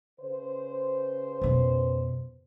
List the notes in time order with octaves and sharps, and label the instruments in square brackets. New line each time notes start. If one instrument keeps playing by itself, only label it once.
[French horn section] C#3 B4 C5
[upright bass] F2 B2